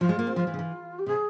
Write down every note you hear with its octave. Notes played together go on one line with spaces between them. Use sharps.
F3 F4
G#3
A#3
C4
F3 F4
E3
C#3
E3
G4
C3 G#4